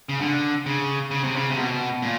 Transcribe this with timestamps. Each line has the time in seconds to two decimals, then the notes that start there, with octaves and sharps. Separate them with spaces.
0.09 C#3
0.21 D3
0.66 C#3
1.11 C#3
1.24 C3
1.36 C#3
1.50 C3
1.56 B2
2.02 A#2